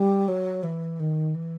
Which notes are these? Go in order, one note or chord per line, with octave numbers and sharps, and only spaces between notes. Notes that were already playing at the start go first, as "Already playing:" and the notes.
Already playing: G3
F#3
E3
D#3
E3